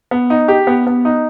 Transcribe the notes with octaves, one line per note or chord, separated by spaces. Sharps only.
B3
D#4
G4
B3
B3
D#4